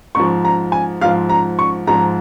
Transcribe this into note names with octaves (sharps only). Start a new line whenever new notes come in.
G#2 F3 C#6
A#5
G#5
G#2 F3 F5
A#5
C#6
G#2 F3 A#5